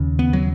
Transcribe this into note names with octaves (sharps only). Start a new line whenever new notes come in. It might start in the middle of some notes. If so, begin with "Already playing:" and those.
Already playing: D#2 C#3
B3
F#3